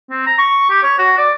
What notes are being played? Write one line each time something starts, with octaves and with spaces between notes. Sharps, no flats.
C4
A#5
C#6
G4
C#5
F#4
D5